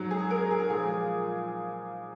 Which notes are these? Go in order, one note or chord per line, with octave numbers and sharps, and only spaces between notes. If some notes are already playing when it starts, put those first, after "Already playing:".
Already playing: G#2 F#3
G#4
A#4
G#4
A#2 F3 G#3 G#4